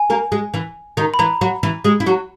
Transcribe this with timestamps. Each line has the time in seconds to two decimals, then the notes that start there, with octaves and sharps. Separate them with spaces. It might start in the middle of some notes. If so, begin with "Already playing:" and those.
Already playing: G#5
0.10 A#3 A#4
0.32 G#3 G#4
0.54 E3 E4
0.97 D#3 D#4
1.14 B5
1.19 E3 E4 A#5
1.41 F#3 F#4
1.63 E3 E4
1.84 G#3 G#4
2.00 E4
2.06 F#3 F#4